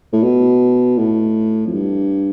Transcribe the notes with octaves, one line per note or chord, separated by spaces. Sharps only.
A2
B2
A2
F2
G2